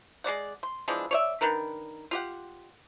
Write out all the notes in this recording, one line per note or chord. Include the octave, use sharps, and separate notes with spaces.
G#3 B3 D5 F#5
C6
E3 F3 G#3 D4
C#5 D5 E5
D#3 D4 A#4 B4
F4 G4 F#5